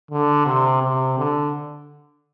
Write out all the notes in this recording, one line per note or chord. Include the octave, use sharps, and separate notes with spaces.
D3
C3
C3
D3